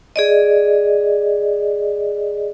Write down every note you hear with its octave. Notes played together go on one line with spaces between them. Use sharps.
G#4 D5 D#5